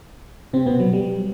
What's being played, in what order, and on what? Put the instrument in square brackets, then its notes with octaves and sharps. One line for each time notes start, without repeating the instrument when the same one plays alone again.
[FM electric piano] C3 C4
B2 B3
F#3
G3